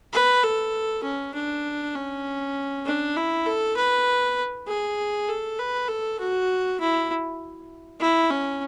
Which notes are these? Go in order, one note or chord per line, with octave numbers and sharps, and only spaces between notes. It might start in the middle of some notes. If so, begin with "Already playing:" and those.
B4
A4
C#4
D4
C#4
D4
E4
A4
B4
G#4
A4
B4
A4
F#4
E4
E4
C#4